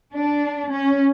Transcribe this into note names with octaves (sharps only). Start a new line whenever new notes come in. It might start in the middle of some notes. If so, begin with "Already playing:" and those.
D4
C#4